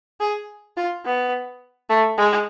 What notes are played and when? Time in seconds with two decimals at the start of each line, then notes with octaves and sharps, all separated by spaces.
0.20 G#4
0.77 F4
1.05 B3
1.90 A3
2.18 G#3